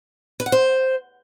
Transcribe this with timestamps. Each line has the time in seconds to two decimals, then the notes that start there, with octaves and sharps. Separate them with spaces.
0.40 B4
0.46 F#5
0.52 C5